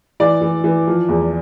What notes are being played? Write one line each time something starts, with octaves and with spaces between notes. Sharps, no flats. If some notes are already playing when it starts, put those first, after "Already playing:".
E3 D5
E3
E3
F3
E2